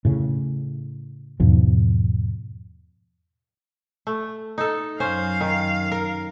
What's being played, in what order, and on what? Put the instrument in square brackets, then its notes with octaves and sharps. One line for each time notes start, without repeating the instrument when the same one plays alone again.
[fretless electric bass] A2 C#3
E2 G#2 B2 F3
[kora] A3
D#4 A4
[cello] F#2 F5 [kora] C#4 C5
[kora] D#3
A#4